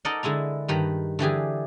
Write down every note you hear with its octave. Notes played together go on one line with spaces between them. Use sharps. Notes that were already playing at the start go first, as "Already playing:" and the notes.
D#4 A4 A#4 D5 D#5 F#5
D3 G#3 E4 A#5
G2 D#3 B4 A#5
D3 E3 G4 G#4